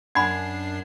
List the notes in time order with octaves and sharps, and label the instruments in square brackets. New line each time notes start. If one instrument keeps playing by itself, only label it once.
[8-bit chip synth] F#2 D4 C7 [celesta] F#5 [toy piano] G#5 B5 [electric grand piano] G#6